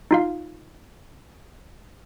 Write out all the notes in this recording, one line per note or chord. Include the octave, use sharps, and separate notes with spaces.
D#4 F4 F5